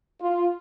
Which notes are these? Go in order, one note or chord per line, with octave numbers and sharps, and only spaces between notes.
F4